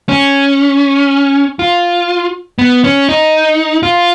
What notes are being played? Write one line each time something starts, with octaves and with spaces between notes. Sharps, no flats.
C#4
F4
B3
C#4
D#4
F4